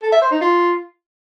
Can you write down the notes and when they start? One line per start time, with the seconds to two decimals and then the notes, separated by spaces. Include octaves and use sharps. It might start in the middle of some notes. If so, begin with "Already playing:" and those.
0.03 A4
0.12 E5
0.22 C5
0.31 D#4
0.41 F4